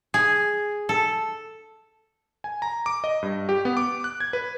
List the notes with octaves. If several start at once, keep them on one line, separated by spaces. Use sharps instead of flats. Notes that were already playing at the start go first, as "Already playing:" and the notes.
G#4
A4
G#5
A#5
D6
D#5
G2
G4
B3
D6
F#6
G#6
B4